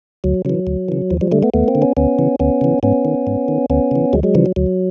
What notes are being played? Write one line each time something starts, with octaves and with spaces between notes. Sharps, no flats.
D2 F#3
C#3 E3 F#3
D2
C#3 E3
D#2 F3
F3 G3
D3 G3 A3
A3 B3
D#2 A3 B3
A#3 C4
D3
B3 C#4
D2 B3 C#4
C#3 E3
D2 B3 C#4
C#3 E3
G#2 B3 C#4
D#3
G#2
D#3
D2 B3 C#4
C#3 E3
D2 F#3 G#3
F#3 G#3
C#3 E3 F3 G3
F#3
D2 F#3